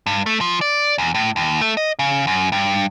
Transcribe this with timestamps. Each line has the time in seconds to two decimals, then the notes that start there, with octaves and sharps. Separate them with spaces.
0.06 G2
0.26 A3
0.41 F3
0.61 D5
0.98 E2
1.15 A2
1.36 D#2
1.61 A3
1.77 D#5
1.99 C#3
2.27 F#2
2.52 G2